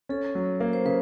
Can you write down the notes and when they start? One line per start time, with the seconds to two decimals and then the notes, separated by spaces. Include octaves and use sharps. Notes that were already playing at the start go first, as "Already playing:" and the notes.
0.09 C#4 A4
0.35 F#3
0.60 A#3
0.73 C5
0.85 C#3 B4